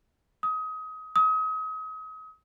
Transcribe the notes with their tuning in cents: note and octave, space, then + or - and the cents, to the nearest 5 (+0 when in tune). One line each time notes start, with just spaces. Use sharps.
D#6 +25
D#6 +35